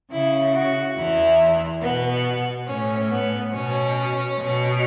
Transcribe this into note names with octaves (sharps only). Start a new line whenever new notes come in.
C#3 E4
F#4
E2 E3 E4
B2 B3
A2 C#4
B3
B2 C#4
B2